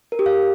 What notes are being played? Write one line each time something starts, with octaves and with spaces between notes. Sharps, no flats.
A#4
G4
F5